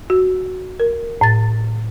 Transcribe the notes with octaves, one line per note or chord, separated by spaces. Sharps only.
F#4
A#4
A2 A6